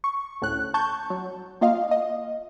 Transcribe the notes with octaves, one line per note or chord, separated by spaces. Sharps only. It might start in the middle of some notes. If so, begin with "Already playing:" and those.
C#6
D2 A2 C#4 F#6
A5 C#6 G6
F#3
A#3 F4 D#5 F5
D#5